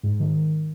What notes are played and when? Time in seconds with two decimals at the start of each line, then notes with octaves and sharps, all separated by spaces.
0.03 G#2
0.20 D#3